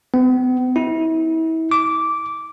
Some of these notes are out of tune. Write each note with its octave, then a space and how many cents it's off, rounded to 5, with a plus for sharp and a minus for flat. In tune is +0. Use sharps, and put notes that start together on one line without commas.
B3 +45
E4 -35
D6 -10